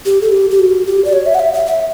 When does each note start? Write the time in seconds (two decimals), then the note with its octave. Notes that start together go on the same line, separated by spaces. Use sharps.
0.06 G4
0.22 A4
0.32 G4
0.51 G4
0.59 F#4
0.86 G4
1.05 D5
1.13 C#5
1.26 E5
1.35 F#5
1.40 E5
1.53 E5
1.66 E5